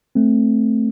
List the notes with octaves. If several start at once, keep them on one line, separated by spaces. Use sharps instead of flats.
A3 C4